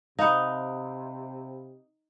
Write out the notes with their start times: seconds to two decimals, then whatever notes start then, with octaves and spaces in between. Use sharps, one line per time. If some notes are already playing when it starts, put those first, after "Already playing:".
0.19 C3 D#4 D#5 F5 F#5 B5